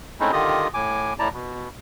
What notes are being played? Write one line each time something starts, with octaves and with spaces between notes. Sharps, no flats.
G#3 A3 C4 C#4 D#4 E4
D3 D#3 F4 G4 D#5 D#6
A2 G#5 D6
A2 E4 D5 A5 A#5
B2